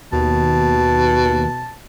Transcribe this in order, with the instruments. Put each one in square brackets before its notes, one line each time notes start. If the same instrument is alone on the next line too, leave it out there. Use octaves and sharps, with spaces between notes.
[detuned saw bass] D#2 [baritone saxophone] B2 [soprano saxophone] A5